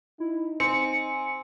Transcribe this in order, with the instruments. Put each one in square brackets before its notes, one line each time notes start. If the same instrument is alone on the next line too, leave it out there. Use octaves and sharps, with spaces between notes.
[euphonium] D#4 [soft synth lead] E4
[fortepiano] C4 [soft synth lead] G#5 [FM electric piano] C#7